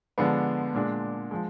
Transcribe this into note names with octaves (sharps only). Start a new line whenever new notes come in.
D3 F3 G#3 B3 D4
A#2 G#3 D4
F3 G#3